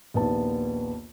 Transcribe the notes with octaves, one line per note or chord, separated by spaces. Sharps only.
A#1 D#2 B3 A5